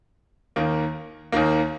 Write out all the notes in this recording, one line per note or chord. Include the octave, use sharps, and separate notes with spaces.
D#2 D#3 A#3
D#2 D#3 A#3